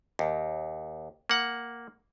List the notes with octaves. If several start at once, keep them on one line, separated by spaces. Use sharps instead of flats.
D#2
A#3 F#5